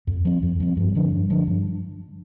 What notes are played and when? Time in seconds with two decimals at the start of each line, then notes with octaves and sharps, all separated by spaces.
0.07 F2
0.25 F3 C4
0.43 F2
0.60 F3 C4
0.77 G2
0.95 D3 F3 D4
1.12 G2
1.30 D3 F3 D4
1.47 G2